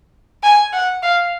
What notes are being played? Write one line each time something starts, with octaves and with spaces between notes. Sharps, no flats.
G#5
F#5
F5